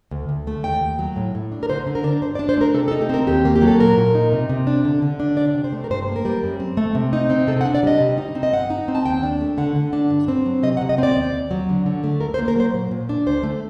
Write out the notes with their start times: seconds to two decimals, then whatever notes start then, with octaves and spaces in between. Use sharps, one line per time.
0.11 D2
0.29 D2
0.47 A3
0.64 D#2 G5
0.81 D#2
0.99 F#3
1.16 A2
1.35 A2
1.52 D4
1.63 A#4
1.69 D3 C5
1.87 D3
1.95 A#4
2.04 D4
2.22 G2 C5
2.35 D5
2.39 D4
2.49 C5
2.57 A3 A#4
2.74 C3 A4
2.88 A4
2.91 D#4
3.01 G4
3.09 C4 A#4
3.27 D#2 G4
3.45 A#3
3.56 G4
3.62 F#3
3.68 A4
3.80 A#2 A#4
3.98 A#2
4.15 D#4
4.32 C3
4.49 C3
4.67 D4
4.85 D3
5.02 D3
5.20 D4
5.37 C3 D5
5.55 C3
5.64 C5
5.73 A3
5.84 A#4
5.91 G2 C5
6.08 A#3
6.16 A#4
6.25 G3
6.43 F#2
6.60 C4
6.77 A3
6.95 C3
7.13 D#4
7.30 C4
7.47 C3 A4
7.61 F#5
7.65 D4
7.75 D5
7.83 G3 D#5
8.00 C3
8.18 D#4
8.35 C4
8.43 D#5
8.53 G2 F#5
8.70 D#4
8.88 C4
8.95 A5
9.06 D#2 G5
9.23 D4
9.41 A3
9.58 D3 F#5
9.76 D3
9.93 D4
10.10 G2
10.28 C4
10.46 F#3
10.63 C3 D#5
10.77 F#5
10.81 C3
10.89 D#5
10.98 C4 D5
11.16 D#2
11.33 D#2
11.51 F#3
11.69 D3
11.86 D3
12.04 A3
12.21 D2 A#4
12.34 C5
12.39 A#3
12.48 A#4
12.56 F#3 C5
12.74 A#2
12.91 A#2
13.09 D4
13.26 D2 C5
13.43 A3